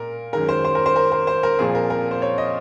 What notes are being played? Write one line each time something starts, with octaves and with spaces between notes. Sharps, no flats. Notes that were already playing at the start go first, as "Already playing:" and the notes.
Already playing: A#2 G#3 A#4
F#2 D#3 G#3 A#4
C5
C5
A#4
C5
A#4
A#4
C5
A#4
A#2 F3 C4 G#4
A#4
A#4
C5
C#5
D#5